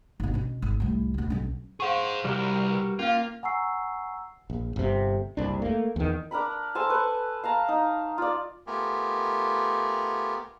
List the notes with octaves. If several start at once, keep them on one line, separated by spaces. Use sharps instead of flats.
G#1 B2
B2 C#4
G#1
C2 A2
D2 B2
B1 C#4
G#4 C5 F5 F#5 C#6
C2 G3 F#4 A#4
B4
A#3 C#4 F4 F5
F#5 G#5 A#5 C#6 E6 C7
A#1
G1 C3
F#1 C2 D4
A3 A#3
E2 D#3
D4 A#4 A#5 B5
A4 C5 G#5 A5
B4 C#6
F5 A5 A#5
D#4
F4 D5
A3 B3 F4 G4 A#4 G#5